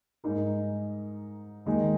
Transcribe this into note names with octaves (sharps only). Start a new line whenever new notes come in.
G#2 G#3 D#4 A#4
D#2 D#3 G#3 D#4